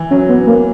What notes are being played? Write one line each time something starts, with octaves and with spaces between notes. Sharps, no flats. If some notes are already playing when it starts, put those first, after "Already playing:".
Already playing: E3
F#3 C#4
B3
A#3